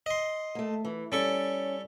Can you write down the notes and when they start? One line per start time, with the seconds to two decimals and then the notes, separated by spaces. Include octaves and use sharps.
0.06 D#5 C6
0.55 A3 A#3
0.85 E3
1.12 G3 C#4 A4 C#6